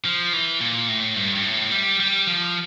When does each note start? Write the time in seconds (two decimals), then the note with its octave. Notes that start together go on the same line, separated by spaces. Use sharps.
0.05 F3
0.33 E3
0.60 A#2
0.88 A2
1.16 G2
1.35 G2
1.44 A2
1.71 G3
2.00 G3
2.27 F3